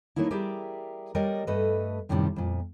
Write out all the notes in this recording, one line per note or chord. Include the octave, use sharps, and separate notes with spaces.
F#3 A3 A#3 D#4 E4
G3 G4 G#4 A#4 D5 E5
F#3 G3 A#4 D5 D#5
G2 A3 A4 B4 D#5
F#2 A2 C3 D#3 G3 D4
F2 A#2